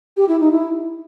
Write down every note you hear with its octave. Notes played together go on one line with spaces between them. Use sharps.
G4
E4
D#4
E4